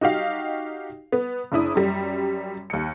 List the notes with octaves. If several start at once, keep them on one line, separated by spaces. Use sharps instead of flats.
D#4 F#4 G4 F5
B3
F#1 D4 E4 D#6
F#2 G3
D#2 C#7